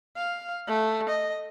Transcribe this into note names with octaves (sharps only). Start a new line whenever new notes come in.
F5
A3
D#5